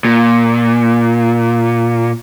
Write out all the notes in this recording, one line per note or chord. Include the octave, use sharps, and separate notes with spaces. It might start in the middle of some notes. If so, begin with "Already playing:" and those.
A#2